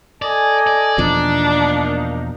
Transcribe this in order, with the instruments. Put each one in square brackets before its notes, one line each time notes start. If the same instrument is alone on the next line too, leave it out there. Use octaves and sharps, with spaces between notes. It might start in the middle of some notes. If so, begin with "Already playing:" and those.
[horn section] A4 D#5 G#5 [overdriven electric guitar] D5
[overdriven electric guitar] D5
[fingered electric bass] E2 B2 F3 [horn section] A#3 D#4 [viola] D4